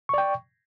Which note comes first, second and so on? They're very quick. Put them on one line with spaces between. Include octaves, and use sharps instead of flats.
C#6 D5 G5